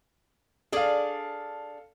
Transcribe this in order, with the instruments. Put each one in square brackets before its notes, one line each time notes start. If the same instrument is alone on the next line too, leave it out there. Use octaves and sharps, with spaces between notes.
[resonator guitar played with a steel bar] D4 G#4 D5 [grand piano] A4 F5